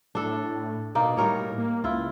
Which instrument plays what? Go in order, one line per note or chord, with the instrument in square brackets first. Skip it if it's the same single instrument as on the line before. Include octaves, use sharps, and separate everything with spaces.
[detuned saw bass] A2 [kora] D4 A4
[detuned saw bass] B2 [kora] A#3 D#4 D5
[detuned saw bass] A2 [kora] G3 A#4 C#5
[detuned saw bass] A#3
[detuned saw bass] C#2 [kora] E4 F4